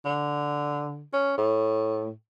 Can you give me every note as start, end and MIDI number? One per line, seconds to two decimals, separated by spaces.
0.05 1.04 50
1.13 1.35 61
1.37 2.11 45